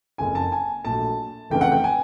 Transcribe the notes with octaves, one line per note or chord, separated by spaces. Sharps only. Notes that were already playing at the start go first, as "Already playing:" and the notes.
F#1 F2 C#3 G#5
A5
G#5
A#1 A#2 F#3 A3 A5
F1 F2 C#3 E3 A3 G5
F#5
G5
G#5